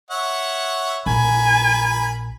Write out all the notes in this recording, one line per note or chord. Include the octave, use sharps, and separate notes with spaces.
C#5 E5 F#5
A#1 A#4 G#5 B5